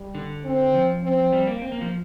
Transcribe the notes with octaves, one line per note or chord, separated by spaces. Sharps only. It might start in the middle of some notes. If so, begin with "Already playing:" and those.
Already playing: G3
D3
C4
F3
C4
G3
A#3
C4
A#3
F3